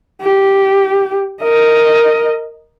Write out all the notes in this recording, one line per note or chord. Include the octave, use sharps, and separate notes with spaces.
G4
A#4 D#5